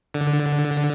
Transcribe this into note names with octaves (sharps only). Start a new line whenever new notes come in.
D3